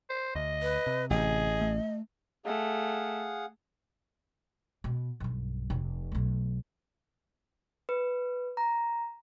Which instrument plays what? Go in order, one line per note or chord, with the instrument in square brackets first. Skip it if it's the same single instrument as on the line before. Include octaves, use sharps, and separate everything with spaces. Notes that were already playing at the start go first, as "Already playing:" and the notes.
[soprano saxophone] C5
[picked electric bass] D2 [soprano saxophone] D#5
[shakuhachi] B4
[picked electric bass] C3
[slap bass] A1 [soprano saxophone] G#4 [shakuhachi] D#5
[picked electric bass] A3
[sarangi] A3 [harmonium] G#4 F5 F#5
[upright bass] B2
B1 G2
F1 C3
B1 A3
[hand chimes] B4
A#5